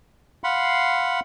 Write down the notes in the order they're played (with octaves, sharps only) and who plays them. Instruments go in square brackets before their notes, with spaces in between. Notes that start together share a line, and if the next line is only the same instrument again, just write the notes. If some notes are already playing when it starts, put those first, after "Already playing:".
[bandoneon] F5 F#5 B5 C6